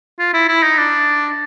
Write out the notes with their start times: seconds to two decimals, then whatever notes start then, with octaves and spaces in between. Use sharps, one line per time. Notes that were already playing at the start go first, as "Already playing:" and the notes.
0.19 F4
0.33 E4
0.48 E4
0.63 D#4
0.78 D4